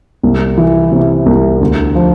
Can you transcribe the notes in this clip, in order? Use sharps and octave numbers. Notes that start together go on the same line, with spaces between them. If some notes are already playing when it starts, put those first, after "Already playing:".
C2
E3
C3
C2
D2
F3